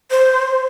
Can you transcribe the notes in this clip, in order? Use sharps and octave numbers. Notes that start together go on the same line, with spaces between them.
C5